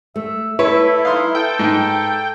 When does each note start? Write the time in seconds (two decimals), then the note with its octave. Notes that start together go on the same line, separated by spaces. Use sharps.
0.16 A3 E5
0.59 E4 A4 B4 C#5
1.05 D#4 F5 C6
1.35 A4 G5
1.59 G#2